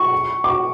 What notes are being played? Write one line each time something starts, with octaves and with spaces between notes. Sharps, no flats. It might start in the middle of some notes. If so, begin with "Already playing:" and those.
Already playing: C#6
D6